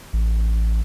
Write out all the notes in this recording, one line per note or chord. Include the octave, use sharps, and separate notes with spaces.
A1